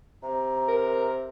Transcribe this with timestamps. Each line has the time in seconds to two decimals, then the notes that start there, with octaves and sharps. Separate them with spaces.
0.23 C3 A#5
0.68 A#4